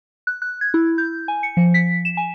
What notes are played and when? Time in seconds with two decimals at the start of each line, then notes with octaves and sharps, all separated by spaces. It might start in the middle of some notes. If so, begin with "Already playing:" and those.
0.27 F#6
0.42 F#6
0.61 G#6
0.74 E4
0.98 G6
1.28 G#5
1.43 C#7
1.57 F3
1.74 B6
2.05 E7
2.17 G#5